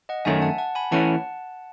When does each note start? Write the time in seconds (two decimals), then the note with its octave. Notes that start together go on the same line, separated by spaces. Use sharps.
0.09 D#5 F#5
0.25 F#2 D#3 A3 C#4 E5 G#5
0.42 F#5 A5
0.58 F#5 A5
0.75 G#5 B5
0.91 E3 A3 C#4 F#5 A5